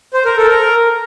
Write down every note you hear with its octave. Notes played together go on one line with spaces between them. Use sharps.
C5
A#4
A4
A#4